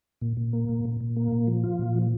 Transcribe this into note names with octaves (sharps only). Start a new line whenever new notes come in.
A#2
A#2
A#3
A#2
A#2
A#2
A#3
A#2
F3
F4
A#2
F3